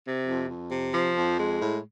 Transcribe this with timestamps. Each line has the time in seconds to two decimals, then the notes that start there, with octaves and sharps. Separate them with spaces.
0.05 C3
0.27 F2
0.49 F2
0.71 C3
0.94 F3
1.16 F2
1.39 G#3
1.61 A2